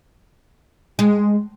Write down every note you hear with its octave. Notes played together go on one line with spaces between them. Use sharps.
G#3